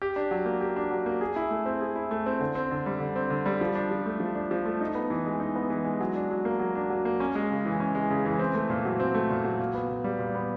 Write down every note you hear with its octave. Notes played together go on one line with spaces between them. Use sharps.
G4
D4
F#3
A#3
G4
D4
F#3
A#3
G#4
E4
A3
C4
G#4
E4
A3
C4
D3
C4
D3
G3
D3
C4
D3
G3
F3
D4
F3
A3
F3
D4
F3
A3
D#4
B3
E3
G#3
D#4
B3
E3
G#3
F#3
D4
F#3
A#3
F#3
D4
F#3
A#3
C#4
G#3
C#3
E3
C#4
G#3
C#3
E3
C4
A3
A#2
F#3
C4
A3
A#2
F#3
A#2
B3
A#2
G3
A#2
B3